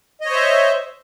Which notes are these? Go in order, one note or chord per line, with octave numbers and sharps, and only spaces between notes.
C5 C#5 D#5 E5